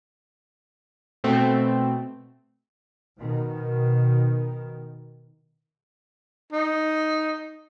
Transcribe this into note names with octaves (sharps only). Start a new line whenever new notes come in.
B2 A3 C4
B2 D#3
D#4